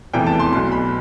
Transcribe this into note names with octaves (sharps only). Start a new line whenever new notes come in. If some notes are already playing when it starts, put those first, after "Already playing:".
F1 E2 C3 E3 G5
A5
C6
B1 B2 C6
B5